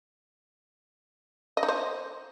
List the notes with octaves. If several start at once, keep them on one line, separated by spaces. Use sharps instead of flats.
D#5
D#4
C5